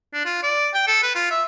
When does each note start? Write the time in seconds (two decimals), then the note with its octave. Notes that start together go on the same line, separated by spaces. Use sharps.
0.13 D4
0.26 F4
0.43 D5
0.74 G5
0.87 A4
1.03 B4
1.15 F4
1.31 E5